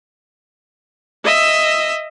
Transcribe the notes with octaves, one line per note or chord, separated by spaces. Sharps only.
D#5 E5 E6